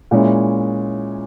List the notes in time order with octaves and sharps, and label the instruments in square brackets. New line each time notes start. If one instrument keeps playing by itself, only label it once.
[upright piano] A#2 G#3 C#4 E4